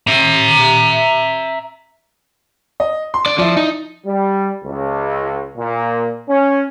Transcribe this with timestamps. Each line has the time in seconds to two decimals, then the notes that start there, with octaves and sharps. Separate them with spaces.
0.07 E5 A#5
2.80 D#5
3.14 C6
3.26 D3 D5
3.39 F3 E4 D5
3.57 D#4
4.06 G3
4.65 C#2
5.56 A#2
6.28 C#4